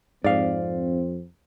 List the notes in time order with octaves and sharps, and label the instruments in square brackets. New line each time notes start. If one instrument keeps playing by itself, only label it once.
[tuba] F2 [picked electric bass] G#2 [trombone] C4 [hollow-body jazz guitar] D5 F5